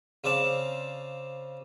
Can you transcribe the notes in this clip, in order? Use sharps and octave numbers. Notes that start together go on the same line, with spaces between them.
C#3 C4 D5 F5 A5